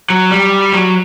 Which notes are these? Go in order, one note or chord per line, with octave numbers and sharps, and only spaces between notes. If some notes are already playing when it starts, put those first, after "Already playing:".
F#3
G3
F#3